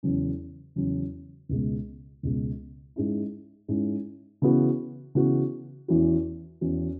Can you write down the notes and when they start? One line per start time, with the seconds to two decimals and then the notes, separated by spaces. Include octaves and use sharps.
0.03 E2 C#3 F#3 C#4
0.76 E2 C#3 F#3 C#4
1.49 C#2 B2 G#3
2.23 C#2 B2 G#3
2.96 G#2 G#3 C#4 E4
3.68 G#2 G#3 C#4 E4
4.42 C#3 E3 B3 F#4
5.15 C#3 E3 B3 F#4
5.88 E2 E3 C#4 F#4
6.61 E2 E3 C#4 F#4